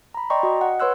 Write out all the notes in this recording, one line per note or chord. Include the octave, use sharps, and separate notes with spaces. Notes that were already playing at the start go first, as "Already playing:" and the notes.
A#5 B5
D5 D#5 G5 A#5 C6 C#6
F#4 D#5
F#5
B4 C#5 C6 E6 F#6